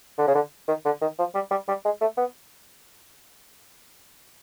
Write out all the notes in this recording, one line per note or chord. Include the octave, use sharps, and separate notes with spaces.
D3
C#3
D3
D#3
D3
D#3
F3
G3
G3
G3
G#3
A3
B3